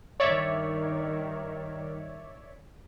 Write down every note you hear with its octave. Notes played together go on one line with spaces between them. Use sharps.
G2 D#3 C#5 D5 E5